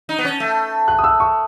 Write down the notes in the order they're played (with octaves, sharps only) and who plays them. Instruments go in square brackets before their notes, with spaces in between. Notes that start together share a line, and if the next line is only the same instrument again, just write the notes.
[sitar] D#4
B3
C#4
A3
[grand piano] F#6
D#6
E6
C#6